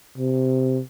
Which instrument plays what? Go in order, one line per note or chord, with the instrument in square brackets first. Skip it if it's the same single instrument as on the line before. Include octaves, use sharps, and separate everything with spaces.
[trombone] C3